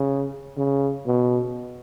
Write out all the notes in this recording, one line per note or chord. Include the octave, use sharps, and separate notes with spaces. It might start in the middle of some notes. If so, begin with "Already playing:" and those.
Already playing: C#3
C#3
B2